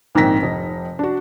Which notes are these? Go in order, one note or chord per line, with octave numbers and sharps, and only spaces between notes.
A#1 G#2 D#3 C4 A#6 B6
F1 D#4
D4 F#4